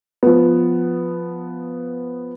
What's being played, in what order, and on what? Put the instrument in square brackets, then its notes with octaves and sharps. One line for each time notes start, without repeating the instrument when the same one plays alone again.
[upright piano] F3 B3